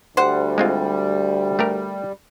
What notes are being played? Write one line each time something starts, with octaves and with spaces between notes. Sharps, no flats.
D2 G3 C5 F#5
G#3 C4 F4
A3 G4 A#4